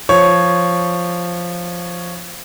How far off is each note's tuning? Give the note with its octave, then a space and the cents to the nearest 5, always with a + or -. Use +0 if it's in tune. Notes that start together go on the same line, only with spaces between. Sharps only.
F3 +0 C#5 +0